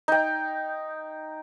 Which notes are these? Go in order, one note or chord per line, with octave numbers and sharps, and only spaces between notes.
D#4 G5